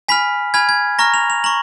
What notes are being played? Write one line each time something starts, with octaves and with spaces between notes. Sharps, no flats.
G#5 B5 F6 B6
G#5 B5 F6 G#6
G#6
A#5 C#6 F6 A#6
F7
F7
A#5 C#6 F#7